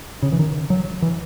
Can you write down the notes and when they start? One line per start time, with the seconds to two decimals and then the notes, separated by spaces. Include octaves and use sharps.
0.23 C#3
0.32 E3
0.39 D#3
0.70 F#3
1.02 E3